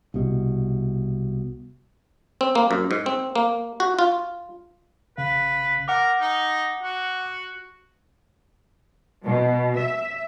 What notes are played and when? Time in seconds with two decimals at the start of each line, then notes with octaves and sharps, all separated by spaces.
0.14 C2 B2
2.41 C4
2.55 A#3
2.71 F#2
2.91 G#2
3.06 C4
3.36 A#3
3.80 F#4
3.99 F4
5.17 A1 C#3 B4 F5
5.88 A#4 F#5 D6
6.20 D#4
6.83 F#4
9.24 B2
9.77 E5